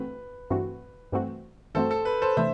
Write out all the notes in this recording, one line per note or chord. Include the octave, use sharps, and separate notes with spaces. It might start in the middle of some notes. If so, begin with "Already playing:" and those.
Already playing: G2 E3 A3 C4 F#4 B4
G2 E3 A3 C4 F#4
G2 E3 A3 C4 F#4
G2 E3 A3 C4 F#4 A4 C5
A4
B4
A4 C5
C3 E3 A3 D4 C5 E5